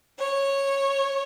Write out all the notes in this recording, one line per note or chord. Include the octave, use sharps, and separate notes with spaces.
C#5